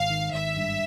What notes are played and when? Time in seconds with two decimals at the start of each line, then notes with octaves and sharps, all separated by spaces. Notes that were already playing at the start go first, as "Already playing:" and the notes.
Already playing: G#1 F5
0.10 D#3
0.33 G#1 E5
0.57 G2